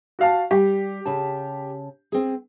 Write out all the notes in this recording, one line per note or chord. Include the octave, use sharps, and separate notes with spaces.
F#4 F5 A5
G3 G4
C#3 A5
C4 G#4